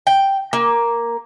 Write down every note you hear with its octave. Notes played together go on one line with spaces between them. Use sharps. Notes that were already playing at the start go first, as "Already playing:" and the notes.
G5
A#3